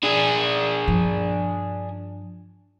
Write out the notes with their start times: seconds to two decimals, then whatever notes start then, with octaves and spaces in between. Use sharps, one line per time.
0.03 D4 G#4
0.88 G2 F3